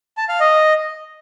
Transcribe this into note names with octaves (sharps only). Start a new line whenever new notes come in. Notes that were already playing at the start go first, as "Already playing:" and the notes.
A5
F5
D#5